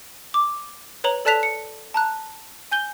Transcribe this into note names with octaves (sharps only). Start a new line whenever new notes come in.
D6
B4 C#5 A#5 F#7
A4 D5 A5 F#6 B6 F7
C#7
A5 A#5 F#6
G#5 G6 G7